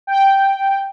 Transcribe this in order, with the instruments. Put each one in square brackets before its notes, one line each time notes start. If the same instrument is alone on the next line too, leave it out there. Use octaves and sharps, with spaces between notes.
[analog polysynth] G5